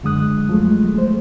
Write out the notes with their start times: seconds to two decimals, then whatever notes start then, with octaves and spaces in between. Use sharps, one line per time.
0.03 F#2 D3 G#3 D#6 F#6
0.49 F3 F#3 G#3 A3
0.94 G#3 A3 C5